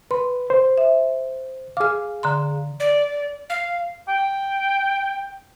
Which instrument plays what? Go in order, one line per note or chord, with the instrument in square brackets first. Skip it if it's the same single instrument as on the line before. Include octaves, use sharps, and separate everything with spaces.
[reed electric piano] B4 [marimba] C6
[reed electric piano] C5
[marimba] E5
[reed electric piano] G#4 F5 [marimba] D6 F6
[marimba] D3 A#5 C6
[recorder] D5
F5
[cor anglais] G5